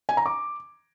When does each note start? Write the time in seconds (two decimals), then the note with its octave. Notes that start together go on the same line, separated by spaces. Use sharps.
0.09 G#5
0.17 A#5
0.26 D6